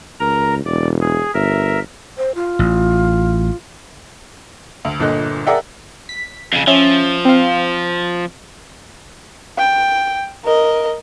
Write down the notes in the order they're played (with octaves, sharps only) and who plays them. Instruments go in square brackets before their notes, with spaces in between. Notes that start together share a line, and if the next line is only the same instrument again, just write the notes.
[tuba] C#2 [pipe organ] A#4 A#5
[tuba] E1 [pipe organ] D5
[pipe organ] G#4
[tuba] G1 [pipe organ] A#4 E5
[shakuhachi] C5
F4
[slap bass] A1
[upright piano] D2
G1 A#2 D3 A4 D#5 F#6
G#4 A#4 D5 E5 F#5 G5
[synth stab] B6
[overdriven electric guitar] F2 C#3
[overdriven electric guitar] F3 [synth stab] C#4 E5
[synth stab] C4 F5
[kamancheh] G5
A#4 D#5